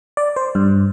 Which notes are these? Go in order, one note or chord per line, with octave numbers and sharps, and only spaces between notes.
D5
C5
G2